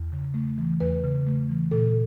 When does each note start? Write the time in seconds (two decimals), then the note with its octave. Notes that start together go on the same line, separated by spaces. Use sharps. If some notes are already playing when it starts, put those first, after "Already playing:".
Already playing: E2
0.12 C#3
0.34 A3
0.58 E3
0.80 E2 B4
1.04 C#3
1.27 A3
1.49 E3
1.71 A#2 A4